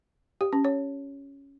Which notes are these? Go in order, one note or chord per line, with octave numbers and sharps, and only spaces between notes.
G4
C#4
C#5